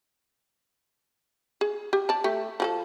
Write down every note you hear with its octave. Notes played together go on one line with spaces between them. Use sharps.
G#4
G4
D5 A5
A3 G4
F3 G#4 A4